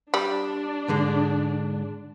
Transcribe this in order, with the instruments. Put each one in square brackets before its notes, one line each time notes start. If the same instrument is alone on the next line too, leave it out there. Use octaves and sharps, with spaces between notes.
[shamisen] G3 [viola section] D4
[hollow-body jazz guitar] G#2 D3 G#3